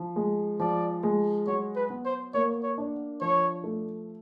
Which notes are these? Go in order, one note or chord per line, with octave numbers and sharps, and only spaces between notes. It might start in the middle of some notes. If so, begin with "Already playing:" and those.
Already playing: F3
G#3
F3 D5
G#3
F#3 C#5
B4
B3
C5
A#3 C#5
C#5
D4
F3 C#5
A3